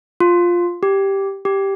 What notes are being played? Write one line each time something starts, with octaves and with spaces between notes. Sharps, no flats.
F4
G4
G4